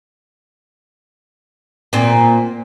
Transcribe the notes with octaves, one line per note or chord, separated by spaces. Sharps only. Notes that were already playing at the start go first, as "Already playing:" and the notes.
A#2 C4